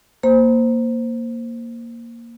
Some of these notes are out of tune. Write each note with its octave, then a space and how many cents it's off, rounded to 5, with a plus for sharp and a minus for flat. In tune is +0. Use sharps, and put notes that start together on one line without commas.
A#3 +0 C5 +0